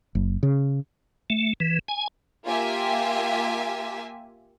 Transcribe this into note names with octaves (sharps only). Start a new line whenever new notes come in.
F#1
C#3
A3
E3
G#5
A#3 F4 G4 E5 G#5